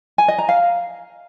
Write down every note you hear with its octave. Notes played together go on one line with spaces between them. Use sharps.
G#5
D#5
A#5
F5